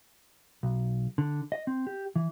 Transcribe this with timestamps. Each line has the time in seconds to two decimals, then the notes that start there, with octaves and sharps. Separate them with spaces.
0.63 B1
1.18 D3
1.52 D#5
1.67 C4
1.87 G4
2.16 E3